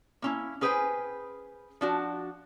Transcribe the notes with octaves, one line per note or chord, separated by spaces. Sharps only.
A#3 C#4 E4
C#4 G#4 B4 C5 G5 G#5
F3 D4 F#4